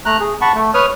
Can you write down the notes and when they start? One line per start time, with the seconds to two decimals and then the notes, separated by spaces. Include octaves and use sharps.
0.05 A3 A#5 F#6
0.20 G#4
0.41 F#5 A5 B5 C#6
0.55 A3
0.74 B4 C#5 D#6 F6